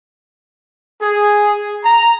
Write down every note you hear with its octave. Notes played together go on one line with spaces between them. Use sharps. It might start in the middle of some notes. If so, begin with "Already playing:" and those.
G#4
A#5